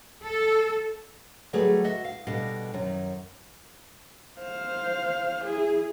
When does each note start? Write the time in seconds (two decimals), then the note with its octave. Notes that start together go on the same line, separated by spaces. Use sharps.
0.24 A4
1.53 D3 F#3 G3 A3 G#4 B4
1.84 F#4 D#5 E5
2.05 F5
2.27 B2 D3 G3 D#5 F5
2.74 F#2 D#3
4.39 C5 F5
5.44 E4 G#4